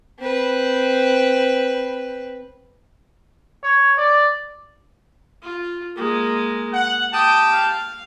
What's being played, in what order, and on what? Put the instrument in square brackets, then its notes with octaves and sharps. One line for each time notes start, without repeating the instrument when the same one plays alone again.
[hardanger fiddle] C4 B4
[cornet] C#5
D5
[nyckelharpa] F4
G#3 A#3
[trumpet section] F#5
[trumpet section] G4 G5 A5 [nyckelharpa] D#6
[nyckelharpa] F5